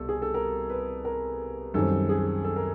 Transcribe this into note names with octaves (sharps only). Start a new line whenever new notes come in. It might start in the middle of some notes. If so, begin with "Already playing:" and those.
Already playing: C2 B2 A4
G#4
A4
A#4
B4
A#4
F#2 D#3 G3 C4 A4
G#4
A4
A#4